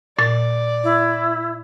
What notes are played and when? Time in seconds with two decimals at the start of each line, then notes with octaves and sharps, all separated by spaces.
0.19 A#2 D5 A6
0.83 E4